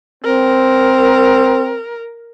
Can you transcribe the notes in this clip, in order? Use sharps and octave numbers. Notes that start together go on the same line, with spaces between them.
C4 A#4